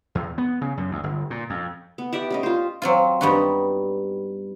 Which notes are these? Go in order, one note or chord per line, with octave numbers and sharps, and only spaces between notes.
E2
B3
C#3
F#2
D2
G1
A#2
F2
B3
G4 D5 E5 F#5
G3 C#4 D#5
F4 C5
F#3 C4 F4
G2 G3 B3 D#4 F#4